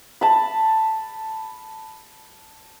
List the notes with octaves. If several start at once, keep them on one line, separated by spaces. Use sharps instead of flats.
A5 B5